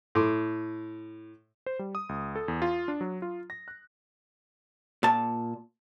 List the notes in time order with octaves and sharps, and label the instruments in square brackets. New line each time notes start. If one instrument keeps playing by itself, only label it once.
[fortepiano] A2 C6 D6
[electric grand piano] C5
G3
D#6
C#2
A4
E2
F4
D4
F#3
F4
A#6
F#6
[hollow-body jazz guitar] A#2 A5